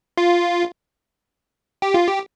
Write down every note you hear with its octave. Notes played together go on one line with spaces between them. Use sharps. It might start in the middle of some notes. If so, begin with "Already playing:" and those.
F4
G4
F4
G4